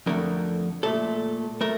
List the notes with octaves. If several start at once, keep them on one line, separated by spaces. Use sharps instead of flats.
F2 D3 A3 A#4
A#2 A3 A4
A3 A#4